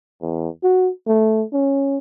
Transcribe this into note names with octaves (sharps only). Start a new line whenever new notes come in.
E2
F#4
A3
C#4